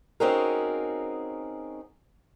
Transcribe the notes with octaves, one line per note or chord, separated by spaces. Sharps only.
C4 C#4 D#4 F#4 G#4 A#4